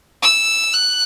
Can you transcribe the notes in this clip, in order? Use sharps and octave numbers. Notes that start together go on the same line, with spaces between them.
E6
F#6